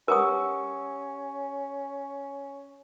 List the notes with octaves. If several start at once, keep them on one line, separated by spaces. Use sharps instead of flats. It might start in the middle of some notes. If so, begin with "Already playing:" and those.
C#4 G4 A#4 F#5 C#6 D#6